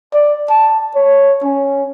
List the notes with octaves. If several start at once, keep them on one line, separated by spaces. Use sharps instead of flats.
D5
A5
C#5
C#4